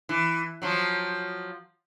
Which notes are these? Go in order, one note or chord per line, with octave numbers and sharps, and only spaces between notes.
E3
F3 F#3